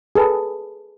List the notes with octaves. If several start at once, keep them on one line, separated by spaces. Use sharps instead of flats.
G#4 A4 B4